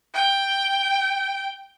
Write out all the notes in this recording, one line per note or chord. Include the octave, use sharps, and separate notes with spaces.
G5